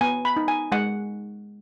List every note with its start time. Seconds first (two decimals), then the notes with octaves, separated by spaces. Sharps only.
0.01 B3 G#5
0.25 B5
0.37 D#4
0.48 G#5
0.72 G#3 F#5